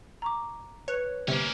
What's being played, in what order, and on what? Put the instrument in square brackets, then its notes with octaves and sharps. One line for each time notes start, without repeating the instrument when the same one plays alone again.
[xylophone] A#5 C#6 D6
[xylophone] B4 F#6 [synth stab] C#5
[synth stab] G1 C3 [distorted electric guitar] A#3 C#4